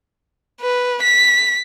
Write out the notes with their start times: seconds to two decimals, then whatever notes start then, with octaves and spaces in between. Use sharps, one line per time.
0.61 B4
1.02 B6